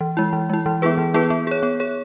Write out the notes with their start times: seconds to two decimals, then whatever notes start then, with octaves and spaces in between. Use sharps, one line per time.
0.01 E3
0.17 G#3 E4
0.33 E3
0.50 G#3 E4
0.66 E3
0.82 B3 E4 G#4 B4
0.98 E3
1.14 B3 E4 G#4 B4
1.30 B3
1.47 G#4 C#5
1.63 B3
1.80 G#4 C#5